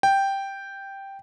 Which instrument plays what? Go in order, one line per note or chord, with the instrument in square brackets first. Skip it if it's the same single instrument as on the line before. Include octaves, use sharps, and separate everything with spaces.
[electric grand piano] G5